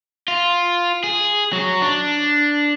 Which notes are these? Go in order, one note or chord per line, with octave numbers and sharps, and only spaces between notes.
F4
G#4
F#3
D4